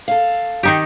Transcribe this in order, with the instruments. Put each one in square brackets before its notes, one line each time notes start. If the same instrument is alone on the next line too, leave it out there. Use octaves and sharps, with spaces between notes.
[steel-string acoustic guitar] A4 F5
[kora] D#3 D#4 G4